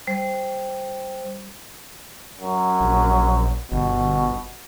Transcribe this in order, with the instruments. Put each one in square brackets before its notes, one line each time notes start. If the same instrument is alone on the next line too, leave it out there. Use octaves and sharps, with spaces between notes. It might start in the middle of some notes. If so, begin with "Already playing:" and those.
[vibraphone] G3 C5
[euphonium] F#2
[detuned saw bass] A#1
[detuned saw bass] G1 [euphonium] B2